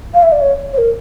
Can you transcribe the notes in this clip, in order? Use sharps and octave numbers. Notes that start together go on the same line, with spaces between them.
F5
E5
D5
C#5
C#5
A#4